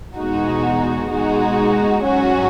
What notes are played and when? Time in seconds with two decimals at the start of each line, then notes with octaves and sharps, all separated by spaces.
0.17 E2 B2 G#3 D#4 F#4
1.10 B2 G#3 D#4 F#4
2.04 G#2 F#3 C#4 F#4